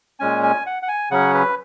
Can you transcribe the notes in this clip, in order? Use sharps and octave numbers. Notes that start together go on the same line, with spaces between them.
A#2 G#3 C#4 G#5
G#5
F#5
F#5
G#5
C#3 F#3 C#4 F#5
B4